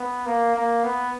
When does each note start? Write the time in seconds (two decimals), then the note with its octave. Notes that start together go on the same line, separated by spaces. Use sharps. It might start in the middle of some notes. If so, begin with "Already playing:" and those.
Already playing: B3
0.26 A#3
0.55 A#3
0.84 B3